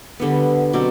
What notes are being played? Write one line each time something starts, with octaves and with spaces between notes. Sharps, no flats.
D3 G3 B3
B2 F#3 C4 D5